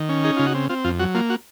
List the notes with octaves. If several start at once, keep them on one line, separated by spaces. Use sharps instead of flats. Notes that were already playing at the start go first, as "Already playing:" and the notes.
Already playing: D#3
C#4
D#4 G#4
C#3 F4
F#4
C4
C4 F4
F2 F4
F#3 F#4
A#3 F4
F#4